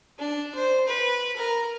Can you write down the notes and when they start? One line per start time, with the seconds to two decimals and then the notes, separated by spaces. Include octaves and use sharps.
0.18 D4
0.55 C5
0.87 B4
1.36 A#4